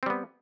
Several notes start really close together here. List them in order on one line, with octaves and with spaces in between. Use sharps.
C4 G3 B3